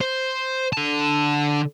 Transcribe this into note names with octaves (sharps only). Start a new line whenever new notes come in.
C5
D3 A5